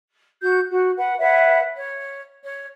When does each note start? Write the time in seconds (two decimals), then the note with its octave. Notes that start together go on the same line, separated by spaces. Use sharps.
0.42 F#4 G6
0.68 F#4
0.96 B4 F#5
1.19 B4 C#5 E5 F#5
1.76 C#5
2.44 C#5